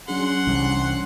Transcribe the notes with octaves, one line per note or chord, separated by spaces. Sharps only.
F#3 C#4 D4 G#4 F#5 C6
C2 E3 G3 D4